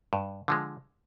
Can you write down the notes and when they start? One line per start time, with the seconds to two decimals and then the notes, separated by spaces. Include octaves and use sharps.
0.13 G2
0.48 D3 F3 G#3